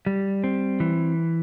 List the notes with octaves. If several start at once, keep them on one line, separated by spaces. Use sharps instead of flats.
G3
C4
E3